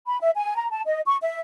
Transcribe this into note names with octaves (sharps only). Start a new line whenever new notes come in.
B5
E5
G#5
A#5
A5
D#5
C#6
E5